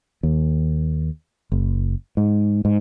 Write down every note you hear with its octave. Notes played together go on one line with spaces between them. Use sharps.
D#2
F#1
G#2
G#2